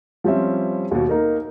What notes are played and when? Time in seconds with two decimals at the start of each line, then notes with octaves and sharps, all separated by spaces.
0.24 F3 G3 C4 C#4 E5
0.91 D#2 B2
1.09 A#3 D#4 A#4